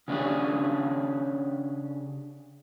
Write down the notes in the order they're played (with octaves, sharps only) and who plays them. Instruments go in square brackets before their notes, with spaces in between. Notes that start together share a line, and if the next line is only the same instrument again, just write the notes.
[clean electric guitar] C#3 B3 C#4 D4 G4 G#4